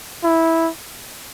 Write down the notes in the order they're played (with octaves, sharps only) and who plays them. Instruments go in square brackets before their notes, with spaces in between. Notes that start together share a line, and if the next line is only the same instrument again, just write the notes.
[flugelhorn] E4